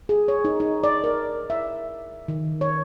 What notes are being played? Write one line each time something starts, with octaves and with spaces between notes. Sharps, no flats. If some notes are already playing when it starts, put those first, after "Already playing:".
G#4
C#5
D#4
D#4
D5
A#4
E5
D#3
C#5